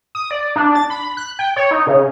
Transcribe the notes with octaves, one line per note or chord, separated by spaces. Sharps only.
D#6
D5
D4
A6
B5
B5
F#6
G5
C#5
D#4
C#3